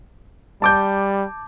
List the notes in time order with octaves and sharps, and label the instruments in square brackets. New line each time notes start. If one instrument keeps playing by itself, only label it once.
[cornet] G3 [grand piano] A5 D6 G6